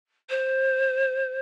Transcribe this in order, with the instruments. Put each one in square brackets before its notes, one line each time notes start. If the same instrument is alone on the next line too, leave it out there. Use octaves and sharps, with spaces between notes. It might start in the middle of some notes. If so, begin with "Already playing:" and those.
[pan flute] C5